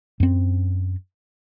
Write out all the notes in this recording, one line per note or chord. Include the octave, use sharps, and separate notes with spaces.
F#2 C4